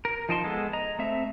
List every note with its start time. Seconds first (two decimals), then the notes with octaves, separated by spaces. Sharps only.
0.05 A#4
0.29 F3 D#4 A5 C6
0.44 G#3 B3 A4
0.73 D#5 A#5
0.99 A3 C4 E5